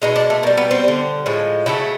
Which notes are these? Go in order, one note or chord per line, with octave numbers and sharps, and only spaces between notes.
B2 G#3 D#4
D4
A3
B2 G3 A#3
B3
C4
D3 G3
A2 F3 G#3
C#3 F#3 A3 E4